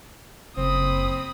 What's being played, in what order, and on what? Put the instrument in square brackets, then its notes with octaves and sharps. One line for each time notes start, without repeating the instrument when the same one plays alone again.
[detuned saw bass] F#1 [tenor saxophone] C4 [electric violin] B5 D#6